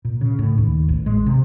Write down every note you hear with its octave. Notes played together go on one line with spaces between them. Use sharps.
A#2
C#3
A2
D#2
A1
G#3
C3